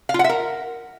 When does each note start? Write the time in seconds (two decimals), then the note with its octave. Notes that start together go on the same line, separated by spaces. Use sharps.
0.09 F5
0.14 F4
0.19 F#5
0.24 E5
0.29 A#4